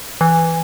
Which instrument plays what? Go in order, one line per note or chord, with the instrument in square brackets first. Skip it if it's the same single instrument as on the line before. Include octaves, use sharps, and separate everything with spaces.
[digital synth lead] E3